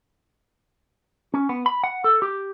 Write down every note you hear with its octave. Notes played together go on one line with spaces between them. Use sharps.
C#4
B3
B5
F#5
A4
G4